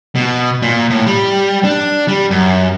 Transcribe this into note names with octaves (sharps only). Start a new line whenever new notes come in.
B2
A#2
A2
G3
D4
G3
F#2